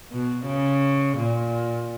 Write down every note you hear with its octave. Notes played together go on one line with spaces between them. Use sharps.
B2
C#3
A#2